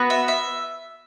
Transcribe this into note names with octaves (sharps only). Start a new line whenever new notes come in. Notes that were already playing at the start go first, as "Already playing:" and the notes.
Already playing: B3 F#4
E5
E5